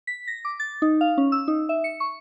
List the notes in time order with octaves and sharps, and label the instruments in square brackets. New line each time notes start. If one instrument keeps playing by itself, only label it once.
[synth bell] B6
A#6
D6
A6
D#4
F5
C#4
E6
D#4
E5
C#7
C#6